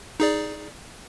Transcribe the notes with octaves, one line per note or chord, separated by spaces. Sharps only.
D#4 G#4 D5